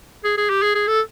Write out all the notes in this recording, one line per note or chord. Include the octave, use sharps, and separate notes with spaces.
G#4
G#4
G4
G#4
G#4
A4